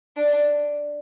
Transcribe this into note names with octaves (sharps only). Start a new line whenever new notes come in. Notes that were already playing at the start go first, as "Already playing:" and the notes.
D4